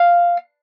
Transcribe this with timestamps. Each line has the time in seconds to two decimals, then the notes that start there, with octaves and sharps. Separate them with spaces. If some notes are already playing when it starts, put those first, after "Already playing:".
Already playing: F5